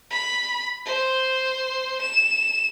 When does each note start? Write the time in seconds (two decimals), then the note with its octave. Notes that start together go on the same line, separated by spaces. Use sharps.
0.10 B5
0.85 C5
2.01 E7